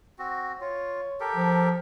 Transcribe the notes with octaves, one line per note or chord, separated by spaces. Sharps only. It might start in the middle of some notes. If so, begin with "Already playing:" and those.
C4 F#4
F4 C#5
G4 A4 A#4
F3